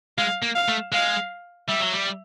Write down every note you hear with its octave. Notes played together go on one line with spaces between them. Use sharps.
G#3 F5
A#3
F5
A3
G#3 F5
G3 E5
F#3
G3